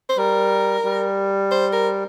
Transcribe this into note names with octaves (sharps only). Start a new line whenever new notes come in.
C5
G3 A#4
G3
C5
A#4